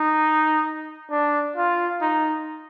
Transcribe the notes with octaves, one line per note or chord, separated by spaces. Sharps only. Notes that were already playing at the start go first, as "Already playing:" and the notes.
Already playing: D#4
D4
F4
D#4